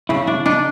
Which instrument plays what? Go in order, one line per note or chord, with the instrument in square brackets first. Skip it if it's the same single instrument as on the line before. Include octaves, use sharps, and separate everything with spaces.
[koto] C#3 [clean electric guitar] E4
[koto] D4 [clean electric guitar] E4
[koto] D4 [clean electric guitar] D#4